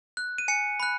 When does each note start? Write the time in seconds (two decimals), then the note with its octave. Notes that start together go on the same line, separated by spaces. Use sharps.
0.17 F#6
0.38 D#7
0.48 G#5 C#7
0.80 B5 F#6